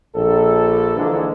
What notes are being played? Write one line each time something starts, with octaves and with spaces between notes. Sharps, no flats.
A#1 A4
G#2 D3 E3 G#3 A#3 D4